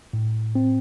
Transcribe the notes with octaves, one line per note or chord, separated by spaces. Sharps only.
A2
C4